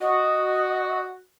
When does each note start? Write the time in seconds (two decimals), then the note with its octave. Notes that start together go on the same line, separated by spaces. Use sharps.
0.01 F#4 D#5